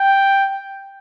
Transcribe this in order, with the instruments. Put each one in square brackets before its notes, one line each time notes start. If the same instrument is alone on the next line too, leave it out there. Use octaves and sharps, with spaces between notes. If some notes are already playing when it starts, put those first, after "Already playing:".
Already playing: [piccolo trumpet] G5